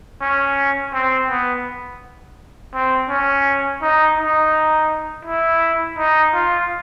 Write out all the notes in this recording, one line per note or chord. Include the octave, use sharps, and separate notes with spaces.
C#4
C4
B3
C4
C#4
D#4
D#4
E4
D#4
F4